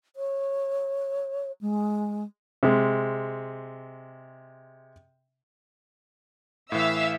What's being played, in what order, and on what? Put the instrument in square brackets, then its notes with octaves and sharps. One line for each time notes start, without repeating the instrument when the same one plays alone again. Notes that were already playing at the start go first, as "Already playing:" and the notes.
[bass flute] C#5
G#3
[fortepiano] C3 G#3
[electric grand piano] A2 E3 [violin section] E5 F5 E6